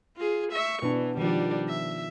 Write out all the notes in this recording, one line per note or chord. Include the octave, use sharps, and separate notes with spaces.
F4 G#4
E5 C#6
B2 E3 B3 D4
D#3 F3 G3 D4
E5